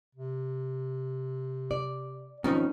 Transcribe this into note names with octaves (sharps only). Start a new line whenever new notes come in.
C3
D5
F2 G#2 D#3 C#4